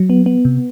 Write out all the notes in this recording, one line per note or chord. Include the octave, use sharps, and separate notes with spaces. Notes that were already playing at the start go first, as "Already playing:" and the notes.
Already playing: F#3
B3
B3
C3